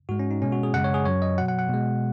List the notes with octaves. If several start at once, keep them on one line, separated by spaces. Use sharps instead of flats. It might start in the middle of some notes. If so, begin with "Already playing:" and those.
G#2 G#3 F#4
C#4
D#4
B2 G#3 C#4
F#4
G#4
F#2 C#3 G#3 F#5
C#5
G#4
F#2 F#3 C#5
D#5
B2 F#3 F#5
F#5
F#5
B2 G#3